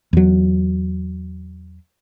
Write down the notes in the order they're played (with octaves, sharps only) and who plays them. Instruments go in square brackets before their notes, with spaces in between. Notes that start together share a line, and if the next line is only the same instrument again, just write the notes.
[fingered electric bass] E2 F#3